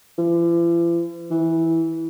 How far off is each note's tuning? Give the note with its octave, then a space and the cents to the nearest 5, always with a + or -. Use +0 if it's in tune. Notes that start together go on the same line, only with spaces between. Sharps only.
E3 +45
E3 -10